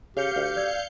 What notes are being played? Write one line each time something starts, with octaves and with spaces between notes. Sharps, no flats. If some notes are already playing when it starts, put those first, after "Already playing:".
C#3 G4 F5 G6 C#7
D2
D5 E6 G#6